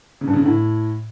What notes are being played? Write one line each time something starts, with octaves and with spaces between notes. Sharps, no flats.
C#3
G2
C#3
D3
A2